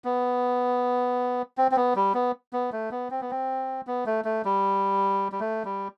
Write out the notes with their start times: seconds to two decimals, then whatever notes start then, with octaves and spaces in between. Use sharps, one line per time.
0.04 B3
1.58 C4
1.72 C4
1.76 B3
1.96 G3
2.14 B3
2.53 B3
2.72 A3
2.91 B3
3.11 C4
3.21 B3
3.31 C4
3.87 B3
4.06 A3
4.25 A3
4.45 G3
5.32 G3
5.40 A3
5.65 G3